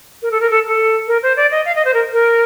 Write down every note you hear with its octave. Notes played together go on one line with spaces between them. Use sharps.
A#4
A4
A#4
A4
A4
A#4
C5
D5
D#5
F5
D#5
C5
A#4
A#4